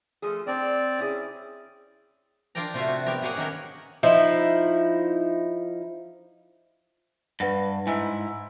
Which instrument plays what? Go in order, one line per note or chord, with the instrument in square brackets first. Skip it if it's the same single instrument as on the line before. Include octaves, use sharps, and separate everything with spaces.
[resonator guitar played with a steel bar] F3 A3 G#4
[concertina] C4 D5 [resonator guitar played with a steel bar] D4
[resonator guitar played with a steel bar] C#4 E4 G#4
[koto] D4 F4 A#4 D5 G5 A#5
C3 A3 F4 F#4 E5
C4 F#4
B3 G4 A#4
A#3 G4 G#4 C#5 F#5 G#5
D#3 C#4 D#4 F#4 A#4
[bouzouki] F3 D#4 E4
[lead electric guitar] G2 [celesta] B4 F#5 A#6
[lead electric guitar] G#2 [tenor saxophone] E4 [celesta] G#5